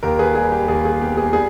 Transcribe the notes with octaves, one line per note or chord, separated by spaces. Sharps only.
D#2 G4 A#4
G#4 B4
G3 G#4
G4
D#2 G#4
G#4
B3 G4
G#4
G3 G#4